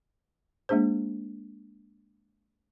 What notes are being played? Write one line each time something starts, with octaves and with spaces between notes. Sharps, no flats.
G#3 A#3 D4 G#4 C5